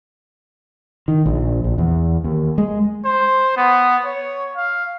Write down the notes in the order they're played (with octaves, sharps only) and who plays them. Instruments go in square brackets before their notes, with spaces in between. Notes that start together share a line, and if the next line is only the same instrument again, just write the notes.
[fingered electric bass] D#3
A#1
A#1
E2
D#2
G#3
[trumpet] C5
B3
C#5
F5